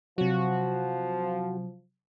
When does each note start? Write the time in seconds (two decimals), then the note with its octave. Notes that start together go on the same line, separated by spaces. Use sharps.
0.18 C3 F3 F#3 F#4